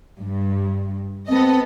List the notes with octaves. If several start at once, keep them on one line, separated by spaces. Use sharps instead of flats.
G2
B3 C4 A4 D#5